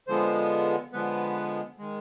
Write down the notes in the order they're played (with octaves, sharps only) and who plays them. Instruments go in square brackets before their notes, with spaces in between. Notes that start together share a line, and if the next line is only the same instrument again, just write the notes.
[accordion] D3 F3 G#3 B3 C5
D3 F3 G#3 B3 B4
D#3 G#3